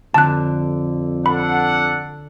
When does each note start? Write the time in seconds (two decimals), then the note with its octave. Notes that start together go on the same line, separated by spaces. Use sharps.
0.14 F2 D3 A5 F#6
1.26 D4 A4 F#5 B5